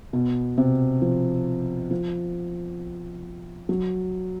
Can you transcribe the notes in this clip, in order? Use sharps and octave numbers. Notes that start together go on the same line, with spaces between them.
B2
C3
F3
F3
F#3